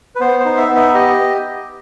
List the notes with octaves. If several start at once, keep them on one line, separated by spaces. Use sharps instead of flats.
B4
B3 C5
C5
D#4
E5
B3
E5
G4 D#5